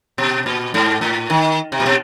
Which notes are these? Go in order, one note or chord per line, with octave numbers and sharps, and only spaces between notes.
B2
A#2
G#2
A2
D#3
C3
A#2
B2